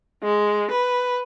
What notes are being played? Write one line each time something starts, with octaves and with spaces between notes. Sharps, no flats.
G#3
B4